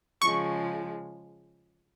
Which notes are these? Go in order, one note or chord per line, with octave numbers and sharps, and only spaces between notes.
C#3 F3 G#3 C#6